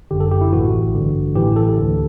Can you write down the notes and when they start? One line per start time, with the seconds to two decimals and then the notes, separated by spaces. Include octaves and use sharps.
0.11 G1 F#2 D3 G4
0.20 A4
0.31 G4
0.41 E4
0.53 A1 A2 E3 F#4
0.94 A1 G2 D3
1.36 A1 A2 E3 G4
1.56 A4
1.78 D2 D3